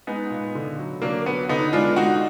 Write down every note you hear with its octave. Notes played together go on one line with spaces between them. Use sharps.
G#3 B3 D#4
A#2
D3
F#3
F#3 A#3 D4
F#3 B3
D3 B3 D#4
G#3 D4 F4
G#3 D#4 F#4